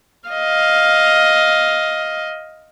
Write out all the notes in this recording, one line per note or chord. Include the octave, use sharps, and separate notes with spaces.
D#5 F5